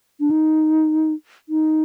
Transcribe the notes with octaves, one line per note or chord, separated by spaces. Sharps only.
D4
D#4
D#4